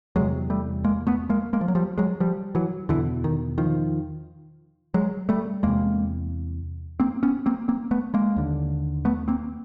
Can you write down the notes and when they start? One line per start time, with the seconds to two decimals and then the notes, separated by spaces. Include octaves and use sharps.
0.16 E2 C3 F#3 G#3
0.50 G3 A3
0.84 G#3 A#3
1.07 A3 B3
1.29 G#3 A#3
1.53 G#3 A#3
1.61 F3
1.68 F#3
1.75 F3 G3
1.98 F#3 G#3
2.20 F3 G3
2.55 E3 F#3
2.89 E2 B2 D3 E3
3.24 D#3
3.58 D#3 F3
4.94 F#3 G#3
5.29 G3 A3
5.63 E2 C3 G#3 A#3
7.00 A#3 C4
7.23 B3 C#4
7.46 A#3 C4
7.68 A#3 C4
7.91 A3 B3
8.14 G#3 A#3
8.36 D#2 D3
9.05 A3 B3
9.28 A#3 C4